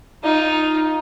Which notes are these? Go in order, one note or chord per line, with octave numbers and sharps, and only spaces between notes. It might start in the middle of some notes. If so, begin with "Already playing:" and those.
D#4 F4